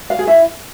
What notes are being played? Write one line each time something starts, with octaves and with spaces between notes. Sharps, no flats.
F5
G#4
E4